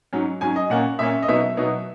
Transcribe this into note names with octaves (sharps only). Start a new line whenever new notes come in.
G#2 F#3 C#4
G#2 F#3 C#4 G#5
D#5
A#2 A#3 C#4 F#5
A#2 A#3 C#4 E5
D#5
B2 F#3 B3 D#4 E5
B2 F#3 B3 D#4